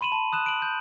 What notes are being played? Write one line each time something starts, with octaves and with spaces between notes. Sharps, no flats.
B5 C6 D#7 E7 F#7
A5
D#6 F#6 E7
D7 F#7
G6